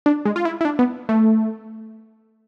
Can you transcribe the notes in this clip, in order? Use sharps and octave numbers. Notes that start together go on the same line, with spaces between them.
D4
G#3
F4
E4
E4
D4
B3
A3